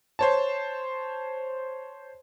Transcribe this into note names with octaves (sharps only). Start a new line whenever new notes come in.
C5 C#5 A5